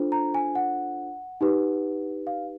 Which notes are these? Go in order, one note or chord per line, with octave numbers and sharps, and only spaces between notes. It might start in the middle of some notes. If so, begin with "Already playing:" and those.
Already playing: D4 F4 A4 C5
A#5
G#5
F#5
D#4 G4 B4
F5